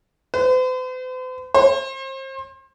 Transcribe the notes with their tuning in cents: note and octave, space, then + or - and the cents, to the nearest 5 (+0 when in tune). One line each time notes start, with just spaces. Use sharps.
C5 -45
C5 +35